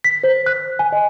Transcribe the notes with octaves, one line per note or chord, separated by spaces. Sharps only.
B6
C5
F#6
G#5
D#5